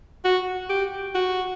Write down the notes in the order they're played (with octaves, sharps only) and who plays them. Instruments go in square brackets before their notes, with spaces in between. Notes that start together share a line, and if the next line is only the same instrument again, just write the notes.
[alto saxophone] F#4
G4
F#4